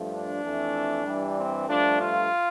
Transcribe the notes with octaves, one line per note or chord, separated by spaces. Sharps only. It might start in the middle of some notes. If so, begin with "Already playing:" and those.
Already playing: G2 F3 A3
D4
F2 E3 A3
G2 E3 G3
C4
G2 F3 A3 D4
F4